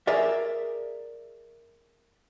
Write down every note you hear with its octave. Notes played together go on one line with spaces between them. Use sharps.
G#4 A#4 D5 E5